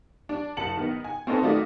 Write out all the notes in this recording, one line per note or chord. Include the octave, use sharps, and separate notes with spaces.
D4
F#1 A5 C#7 F#7
D#3 B3 D#4
G#5
C4 C#4 D#4 A4 B4 C5
D#3 A3 D#4 F4 F#4 D5